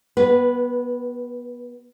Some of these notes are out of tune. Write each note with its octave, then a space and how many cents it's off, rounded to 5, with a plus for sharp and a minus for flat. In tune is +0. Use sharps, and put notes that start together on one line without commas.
B3 -25 G4 -45 B4 +0